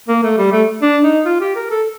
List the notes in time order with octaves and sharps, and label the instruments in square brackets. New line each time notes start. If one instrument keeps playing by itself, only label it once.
[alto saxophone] A#3
A3
G3
A3
D4
D#4
F4
G4
A#4
A4